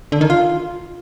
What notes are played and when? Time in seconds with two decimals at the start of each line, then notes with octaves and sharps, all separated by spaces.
0.12 D3
0.21 D#3
0.30 F4